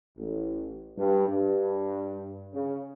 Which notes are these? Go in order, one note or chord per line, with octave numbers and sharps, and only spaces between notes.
A1
G2
G2
C#3